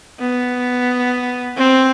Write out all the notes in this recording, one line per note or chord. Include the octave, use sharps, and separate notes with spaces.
B3
C4